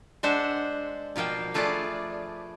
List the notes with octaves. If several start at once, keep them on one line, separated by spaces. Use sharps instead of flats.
G#3 D4 C5 E5 F#5
B2 F3 A#3 F5 G5
F3 A3 F4 G#4 B4 D5